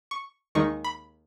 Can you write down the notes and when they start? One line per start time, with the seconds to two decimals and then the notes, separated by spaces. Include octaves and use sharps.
0.11 C#6
0.55 D#2 D#3 G#3 D#4 C#6
0.84 B5